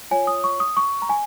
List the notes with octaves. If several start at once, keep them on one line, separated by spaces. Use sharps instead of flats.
F4 C#5 G#5
D#6
C#6
D#6
C#6
A#5
G#5